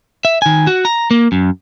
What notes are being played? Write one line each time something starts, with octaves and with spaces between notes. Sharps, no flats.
E5
D#3 G#5
F#4
A#5
A#3
F#2